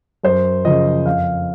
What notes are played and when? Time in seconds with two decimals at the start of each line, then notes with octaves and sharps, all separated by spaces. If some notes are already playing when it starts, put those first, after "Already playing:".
0.24 F#2 C5
0.65 C#3 F3 D#5
1.06 F2 F5